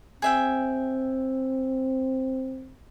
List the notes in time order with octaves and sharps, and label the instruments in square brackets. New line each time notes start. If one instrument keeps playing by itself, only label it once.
[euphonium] C4 [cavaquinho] G#4 E5 G5